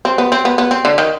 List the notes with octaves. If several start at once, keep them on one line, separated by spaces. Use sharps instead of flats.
C4
B3
C4
B3
B3
C4
D3
D#3